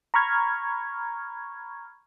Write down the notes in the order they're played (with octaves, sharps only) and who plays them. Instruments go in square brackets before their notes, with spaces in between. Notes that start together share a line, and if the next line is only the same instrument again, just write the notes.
[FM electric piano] A#5 B5 C#6 F6 G#6